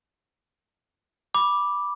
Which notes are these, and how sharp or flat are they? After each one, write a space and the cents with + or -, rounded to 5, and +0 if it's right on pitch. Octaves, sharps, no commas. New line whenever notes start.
B5 -10 D6 +0